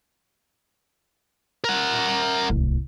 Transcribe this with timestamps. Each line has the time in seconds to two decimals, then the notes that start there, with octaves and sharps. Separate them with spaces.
1.64 A#4 F#5
2.50 D1 C2